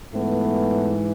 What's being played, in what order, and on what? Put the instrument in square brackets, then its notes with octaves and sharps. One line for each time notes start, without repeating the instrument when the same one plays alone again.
[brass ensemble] G#2 E3 A3 B3